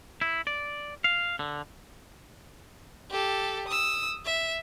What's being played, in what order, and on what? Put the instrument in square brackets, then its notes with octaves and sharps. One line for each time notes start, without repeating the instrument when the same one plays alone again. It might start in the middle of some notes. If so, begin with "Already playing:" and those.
[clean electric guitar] E4
D5
F5
D3
[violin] G4 A4
D#6 E6
E5